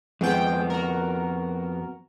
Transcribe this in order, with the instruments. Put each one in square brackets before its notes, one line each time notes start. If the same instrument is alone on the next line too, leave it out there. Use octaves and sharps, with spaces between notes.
[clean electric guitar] F2 B3 [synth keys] G#3 G5
[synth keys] F#4 A#4